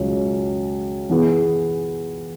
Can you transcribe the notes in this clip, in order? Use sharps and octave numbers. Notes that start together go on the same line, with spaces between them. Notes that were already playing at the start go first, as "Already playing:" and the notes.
Already playing: C#2 C#3 F#3 C#4
E3 B3 E4 G#4